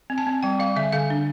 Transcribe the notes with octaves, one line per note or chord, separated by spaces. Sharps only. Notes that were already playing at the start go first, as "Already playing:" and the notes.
C4
A5
C4
G3 G5
G3 F5
D3 E5
D3 F5
D4